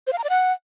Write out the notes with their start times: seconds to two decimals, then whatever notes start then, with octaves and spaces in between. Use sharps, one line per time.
0.07 C5
0.13 F5
0.18 A#5
0.24 D5
0.30 F#5